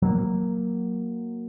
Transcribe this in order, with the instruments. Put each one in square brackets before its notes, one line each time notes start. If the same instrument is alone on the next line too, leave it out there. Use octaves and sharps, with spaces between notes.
[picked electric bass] F#3 A#3